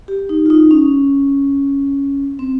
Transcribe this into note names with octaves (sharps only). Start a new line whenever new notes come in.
G4
D#4
F4
D#4
C#4
C4